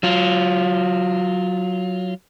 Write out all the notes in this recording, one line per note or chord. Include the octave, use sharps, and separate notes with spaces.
F#3 F4